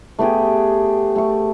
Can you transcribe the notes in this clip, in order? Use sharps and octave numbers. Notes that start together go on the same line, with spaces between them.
A3 B3 G4 G#4
A3 C#6